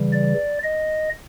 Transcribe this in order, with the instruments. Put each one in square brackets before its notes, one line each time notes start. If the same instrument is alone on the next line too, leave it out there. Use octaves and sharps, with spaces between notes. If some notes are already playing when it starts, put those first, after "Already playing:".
Already playing: [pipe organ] C#3 E3 G3
D5
D#5